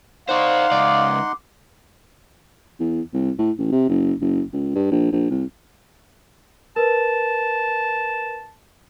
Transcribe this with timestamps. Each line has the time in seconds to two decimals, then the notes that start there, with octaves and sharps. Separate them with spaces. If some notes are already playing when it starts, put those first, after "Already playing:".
0.29 D#4 C5 D5 F5 F#5 C6
0.71 C#2 D5 D6
2.80 E2
3.13 C2
3.39 A2
3.58 A1
3.71 C3
3.89 F#1
4.21 F#1
4.53 C#2
4.75 G2
4.91 A#1
5.12 A#1
5.30 C2
6.76 A#4 B4 A5